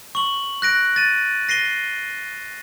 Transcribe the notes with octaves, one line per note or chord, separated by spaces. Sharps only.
C#6 F#7
F#6 A#6 D7
A6 D#7
A#6 C7 D#7 G7